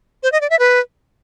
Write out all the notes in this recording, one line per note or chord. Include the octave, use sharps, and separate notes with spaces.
C5
D#5
D5
E5
B4